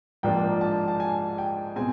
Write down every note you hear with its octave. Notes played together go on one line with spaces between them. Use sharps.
G#2 F3 A#3 D4 G5
A5
A5
G#5
G5
B2 G#3 C4 G#5